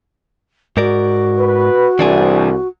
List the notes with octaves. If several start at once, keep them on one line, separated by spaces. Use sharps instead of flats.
G#2 F#4 A#4 D5
B4
C2 E3 D4 G#4